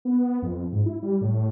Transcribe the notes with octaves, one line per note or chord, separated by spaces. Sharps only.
B3
F2
G#2
E4
G3
A2